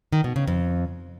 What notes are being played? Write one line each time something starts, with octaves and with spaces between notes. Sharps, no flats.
D#3
B2
C#3
F2